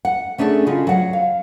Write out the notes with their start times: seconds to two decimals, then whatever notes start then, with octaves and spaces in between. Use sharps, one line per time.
0.05 F#5
0.38 A3 C#4 D4 G#4 A4
0.66 C#3 G#3 F4 F#4
0.87 F#3 F#5
1.13 F5